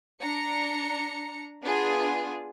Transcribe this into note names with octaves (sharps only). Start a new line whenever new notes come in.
D4 A#5 C#7
B3 D4 F4 G#4